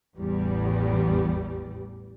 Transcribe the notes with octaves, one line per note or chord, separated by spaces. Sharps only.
A1 E2 G3